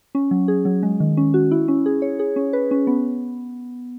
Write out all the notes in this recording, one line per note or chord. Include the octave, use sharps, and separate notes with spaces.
C#4
F#3
G#4
F#3
G#3
D#3
C#4
F#4
E4
C#4
G#4
C#5
G#4
C#4
B4
C#4
B3